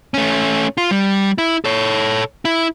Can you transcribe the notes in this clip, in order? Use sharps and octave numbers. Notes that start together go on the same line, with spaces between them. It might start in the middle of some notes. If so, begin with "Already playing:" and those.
A3 C#4
F4
G3
E4
A4 C#5
E4